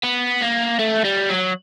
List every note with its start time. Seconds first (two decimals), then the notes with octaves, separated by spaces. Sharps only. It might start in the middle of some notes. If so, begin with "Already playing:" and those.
0.03 B3
0.42 A#3
0.79 A3
1.05 G3
1.30 F#3